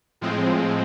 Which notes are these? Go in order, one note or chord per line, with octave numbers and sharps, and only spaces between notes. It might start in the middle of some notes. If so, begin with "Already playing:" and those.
A2 F3 G#3 C4